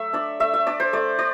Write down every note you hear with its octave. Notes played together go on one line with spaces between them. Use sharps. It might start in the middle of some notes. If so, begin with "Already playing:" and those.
Already playing: F#3 A3 E5
D4 D5
A3 E5
E5
D4 D5
C5
A3 D5
D5